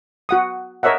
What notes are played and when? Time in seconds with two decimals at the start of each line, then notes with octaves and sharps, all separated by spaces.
0.29 F#4 F#5 D#6
0.83 A#4 C#5 D#5 E5 F#5